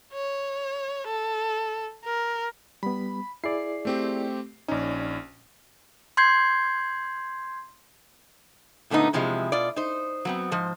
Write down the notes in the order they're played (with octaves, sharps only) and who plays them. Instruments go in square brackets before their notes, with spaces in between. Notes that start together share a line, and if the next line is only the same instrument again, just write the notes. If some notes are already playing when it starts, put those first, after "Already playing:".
[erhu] C#5
A4
A#4
[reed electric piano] G3 B3 [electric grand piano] B5
[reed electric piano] E4 G#4 D5 [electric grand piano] C7
[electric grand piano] A3 C4 G4
[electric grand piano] A#1 C#4 [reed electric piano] D#4 D5
[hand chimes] C6 G6 G#6 C7
[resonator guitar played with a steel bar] A#2 D3 A3 B3 D#4
E2 C3 F3 G#3 E4
B2 F4 D5
D#4 C5
F#3 B3 C4
G#2 F3 C5